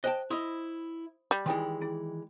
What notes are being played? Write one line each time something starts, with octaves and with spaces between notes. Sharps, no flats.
C5 D#5 G5 A5
E4 D#5 B5 C6 D#6
G3
D#3 E3 G#3 E4 G5 C6
E4 G#4